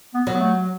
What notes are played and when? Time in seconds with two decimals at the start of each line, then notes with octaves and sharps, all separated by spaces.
0.14 B3
0.27 F#3
0.34 B3
0.40 A3